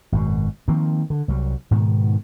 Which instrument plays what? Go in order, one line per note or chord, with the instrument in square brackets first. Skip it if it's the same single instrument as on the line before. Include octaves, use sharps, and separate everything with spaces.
[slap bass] G#1 F#2 B2
D#3 F3 A#3 C4
D3
C2 F#3 G3
G#2 B2 D#3 B3